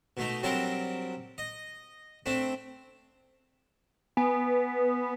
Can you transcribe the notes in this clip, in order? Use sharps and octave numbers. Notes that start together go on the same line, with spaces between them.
B2 A3 D#4
F#3 G3 C4 D4 A4 A#4
D#5
A3 C4 D4
B3 G#5